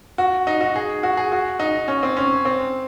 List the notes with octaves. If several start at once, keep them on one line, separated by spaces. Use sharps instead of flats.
F#4
D#4
F#4
G#4
F#4
G#4
F#4
D#4
C#4
C4
C#4
C4